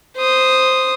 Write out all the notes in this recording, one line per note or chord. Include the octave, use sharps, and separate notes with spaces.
C5 D#6